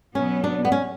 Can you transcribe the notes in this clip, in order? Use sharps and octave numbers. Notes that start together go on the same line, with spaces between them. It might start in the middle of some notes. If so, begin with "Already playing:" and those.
B2 F#3 B3 C#4
D4
B3
C#4